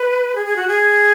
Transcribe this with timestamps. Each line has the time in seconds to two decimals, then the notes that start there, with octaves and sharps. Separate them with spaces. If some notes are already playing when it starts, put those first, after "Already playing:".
Already playing: B4
0.35 G#4
0.46 G#4
0.56 F#4
0.68 G#4